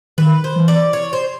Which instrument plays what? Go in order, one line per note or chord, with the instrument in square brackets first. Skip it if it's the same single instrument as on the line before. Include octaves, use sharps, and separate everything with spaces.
[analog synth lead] D#3 [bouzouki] B4
[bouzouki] C5
[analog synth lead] E3
[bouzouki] D5
C#5
C5